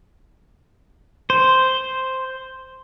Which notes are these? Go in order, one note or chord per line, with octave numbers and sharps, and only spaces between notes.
C5